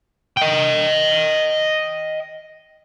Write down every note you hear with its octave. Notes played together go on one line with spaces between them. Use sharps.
D#5 G5